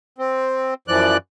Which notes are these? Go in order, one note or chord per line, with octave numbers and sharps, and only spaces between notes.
C4
F#2 E3 F3 D5 F#6